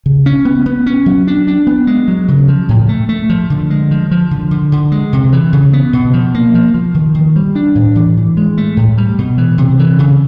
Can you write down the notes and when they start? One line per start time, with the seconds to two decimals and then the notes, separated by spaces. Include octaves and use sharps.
0.06 C#3
0.26 C#4
0.45 B3
0.66 B3
0.86 C#4
1.06 F#3
1.27 D4
1.47 D4
1.67 B3
1.87 G#3
2.08 F#3
2.28 C#3
2.48 F3
2.69 A2
2.89 A3
3.09 A3
3.30 F3
3.50 D3
3.70 G#3
3.91 F3
4.11 F3
4.31 D3
4.51 D3
4.72 D3
4.92 G#3
5.13 C3
5.33 E3
5.53 C#3
5.73 B3
5.93 B2
6.13 F3
6.35 A#3
6.54 F3
6.74 F3
6.94 D#3
7.15 D#3
7.36 G3
7.55 D4
7.75 A2
7.96 E3
8.17 E3
8.37 G#3
8.58 A3
8.77 A2
8.98 G3
9.18 B2
9.38 E3
9.58 C3
9.79 E3
9.99 C#3